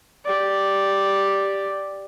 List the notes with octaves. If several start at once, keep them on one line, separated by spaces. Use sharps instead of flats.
G4 D5